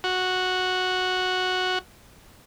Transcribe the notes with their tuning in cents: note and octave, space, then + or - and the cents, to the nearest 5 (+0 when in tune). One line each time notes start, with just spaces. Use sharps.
F#4 -5